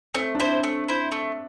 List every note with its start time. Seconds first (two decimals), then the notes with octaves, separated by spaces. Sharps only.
0.15 A3 C4
0.35 D4
0.39 C4 E4 C5
0.63 A3
0.88 E4 C5
1.12 A3